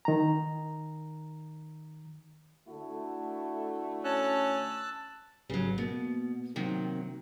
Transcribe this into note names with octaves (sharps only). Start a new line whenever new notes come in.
D#3 A#5
D3 A3 E4 F#4
C#4 A5 E6 F#6
G#1 C#3 F#3
B2 A#3
C3 D#3 F#3